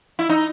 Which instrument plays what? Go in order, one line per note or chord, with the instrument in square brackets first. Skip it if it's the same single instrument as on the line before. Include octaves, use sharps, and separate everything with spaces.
[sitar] E4
D#4